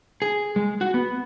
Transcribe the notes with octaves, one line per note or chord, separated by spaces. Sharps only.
G#4
G#3
F#4
B3